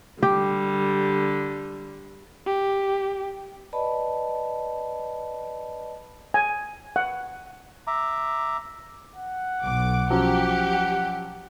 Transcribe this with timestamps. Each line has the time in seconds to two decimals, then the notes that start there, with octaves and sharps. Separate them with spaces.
0.23 D3 G3 G4
2.46 G4
3.73 B4 D5 D#5 A5 B5
6.34 G#5
6.96 F#5
7.87 E5 A#5 D6
9.16 F#5
9.63 B1 D6
10.10 F3 F#3 C#4 G4